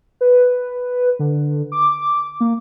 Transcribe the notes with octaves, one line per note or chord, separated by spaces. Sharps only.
B4
D3
D6
A#3